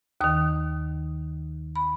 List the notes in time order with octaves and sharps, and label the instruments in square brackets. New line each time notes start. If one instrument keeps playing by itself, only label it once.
[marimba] D#2 D#3 D#6
B5